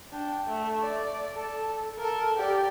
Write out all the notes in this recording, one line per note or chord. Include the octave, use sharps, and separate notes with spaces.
D4 G5
A3
D5
A4
A4 A#4
G4 D5